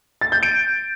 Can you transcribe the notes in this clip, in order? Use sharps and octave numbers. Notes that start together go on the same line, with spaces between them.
A6
G6
D7